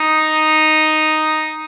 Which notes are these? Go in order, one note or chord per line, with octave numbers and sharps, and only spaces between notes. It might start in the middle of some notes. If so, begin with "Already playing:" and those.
Already playing: D#4